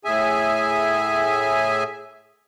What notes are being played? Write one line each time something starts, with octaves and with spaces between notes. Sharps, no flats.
A2 G#4 E5 G#5